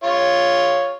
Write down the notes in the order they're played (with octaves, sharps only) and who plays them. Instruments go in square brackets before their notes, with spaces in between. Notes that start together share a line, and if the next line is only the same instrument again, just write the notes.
[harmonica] F4 C#5